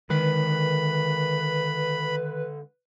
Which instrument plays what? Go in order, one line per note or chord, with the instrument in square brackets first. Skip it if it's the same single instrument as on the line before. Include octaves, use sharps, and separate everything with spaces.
[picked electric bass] D3 G#3 [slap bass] D#3 [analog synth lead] B4 [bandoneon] B5